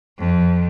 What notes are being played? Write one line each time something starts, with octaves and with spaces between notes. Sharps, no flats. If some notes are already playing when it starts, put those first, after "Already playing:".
F2